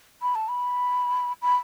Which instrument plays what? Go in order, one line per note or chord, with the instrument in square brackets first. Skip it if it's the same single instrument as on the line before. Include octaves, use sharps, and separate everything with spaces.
[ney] B5
A5
B5
B5